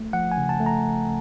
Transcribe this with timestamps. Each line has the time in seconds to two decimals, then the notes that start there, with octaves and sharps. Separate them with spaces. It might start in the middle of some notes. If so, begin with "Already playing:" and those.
Already playing: A3
0.13 F3 F#5
0.32 G#5
0.38 C#3
0.49 A5
0.60 A3
0.66 A#5